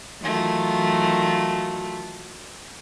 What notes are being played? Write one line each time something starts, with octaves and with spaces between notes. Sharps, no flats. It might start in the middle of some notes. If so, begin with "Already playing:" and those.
D#3 E3 F#3 A3 F4